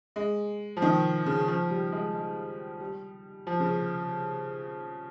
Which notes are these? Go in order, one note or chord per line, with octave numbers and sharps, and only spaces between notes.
G#3
F3
D#3
C#3
F3
G3
G#3
G#3
G3
F3
C#3